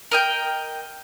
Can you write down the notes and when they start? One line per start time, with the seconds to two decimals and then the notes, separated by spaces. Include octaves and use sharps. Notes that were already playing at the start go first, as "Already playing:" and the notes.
0.11 A#4 D#5 G5